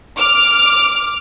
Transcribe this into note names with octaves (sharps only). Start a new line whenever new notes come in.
D6 F6